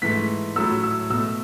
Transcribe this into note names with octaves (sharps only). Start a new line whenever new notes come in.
G#2 E3 A3 B6
A2 F#3 A3 E6
E6
B2 A3 E6